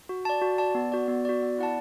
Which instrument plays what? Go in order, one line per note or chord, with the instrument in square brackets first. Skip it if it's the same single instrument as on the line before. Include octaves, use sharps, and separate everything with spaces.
[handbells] F#4
D5 A5
F#4
D5 A5
B3
F#4 D5
B3
F#4 D5
B3
E4 D5 F#5 A5